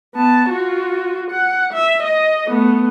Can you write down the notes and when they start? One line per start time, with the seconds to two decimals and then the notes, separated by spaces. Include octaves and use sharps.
0.15 B3 A5
0.50 F4 F#4
1.31 F#5
1.74 E5
2.03 D#5
2.47 A3 B3